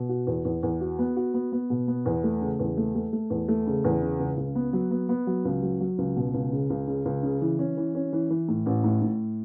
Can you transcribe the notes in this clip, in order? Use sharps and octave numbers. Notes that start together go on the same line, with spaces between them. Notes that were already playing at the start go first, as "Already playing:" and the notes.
Already playing: B2
F#4
E2
E2
E2
F#4
B3
F#4
B3
B3
B2
B3
E2
A3
C#3
E2
A3
A3
A3
E2
A3
C#3
E2
C#3
C#2
C#2
B3
F#3
B3
B3
F#3
C#2
F#3
F#3
C#2
B2
C#2
C#3
C#2
C#3
C#2
C#3
E3
C#4
E3
C#4
E3
E3
A2
A1
A2
A2